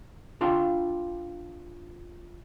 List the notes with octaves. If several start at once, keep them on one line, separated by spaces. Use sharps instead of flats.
D4 F4 F5 G5